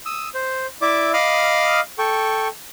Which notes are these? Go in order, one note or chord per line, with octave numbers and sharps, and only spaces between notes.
D#6 E6
C5
E4 D5 E5 D6
D#5 F5 B5 D6 D#6 F6
A4 G5 C#6